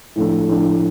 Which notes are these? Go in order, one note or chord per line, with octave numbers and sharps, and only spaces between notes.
A2 F3 A3 D4
A2 F3 A3 D4